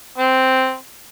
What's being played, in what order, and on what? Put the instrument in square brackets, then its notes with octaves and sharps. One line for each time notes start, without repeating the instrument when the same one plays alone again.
[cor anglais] C4